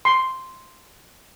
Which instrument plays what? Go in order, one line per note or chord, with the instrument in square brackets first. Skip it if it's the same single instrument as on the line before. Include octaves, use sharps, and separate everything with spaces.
[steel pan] C6